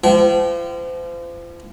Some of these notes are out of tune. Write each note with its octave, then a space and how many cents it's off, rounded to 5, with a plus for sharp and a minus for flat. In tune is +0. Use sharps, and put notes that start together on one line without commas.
F3 -35 G5 -40